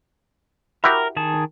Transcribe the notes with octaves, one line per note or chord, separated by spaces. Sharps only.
E4 F#4 G4 A#4
D#3 G#4 A5